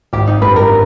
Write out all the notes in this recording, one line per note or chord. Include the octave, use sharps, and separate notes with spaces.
G#1 G4
D#4
G2 G3 B4
A#4